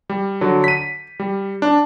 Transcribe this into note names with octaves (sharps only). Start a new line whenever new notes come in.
G3
D3 F#3
B6 D#7
G3
D4